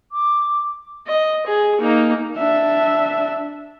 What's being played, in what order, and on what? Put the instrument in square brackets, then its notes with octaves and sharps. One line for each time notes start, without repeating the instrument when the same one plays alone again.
[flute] D6
[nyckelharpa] D#5
G#4
A#3 D#4
[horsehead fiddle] D4 E5